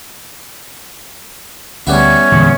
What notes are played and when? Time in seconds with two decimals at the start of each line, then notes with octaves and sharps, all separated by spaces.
1.87 D2 G3 B3 C#4 E4
2.32 E2 A#2 D3 G#3